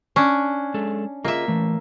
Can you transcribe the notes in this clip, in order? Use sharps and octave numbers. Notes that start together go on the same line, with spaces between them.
C#4 D4
G#3 G#4 A4
A#3 F4 G#4 D#5 E5
E3 A3